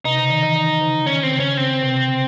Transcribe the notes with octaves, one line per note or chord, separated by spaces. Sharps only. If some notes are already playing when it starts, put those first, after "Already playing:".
C3 D#4
C#3
D#3
E3
D#3
C#3
D#3 C#4
C4
C#3
C#4
C#3 C4
C3
C#3